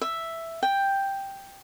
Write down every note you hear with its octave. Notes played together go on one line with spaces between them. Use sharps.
E5
G5